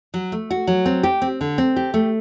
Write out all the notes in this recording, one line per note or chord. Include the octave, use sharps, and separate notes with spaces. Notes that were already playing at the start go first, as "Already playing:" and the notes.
F#3
A3
F#4
F#3
C4
G4
C4
D3
C4
G4
A3